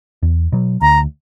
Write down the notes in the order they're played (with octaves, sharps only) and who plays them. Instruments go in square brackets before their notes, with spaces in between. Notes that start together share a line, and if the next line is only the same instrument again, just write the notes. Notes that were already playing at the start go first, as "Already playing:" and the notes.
[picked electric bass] E2
B2 F#3
[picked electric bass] D2 [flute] A#5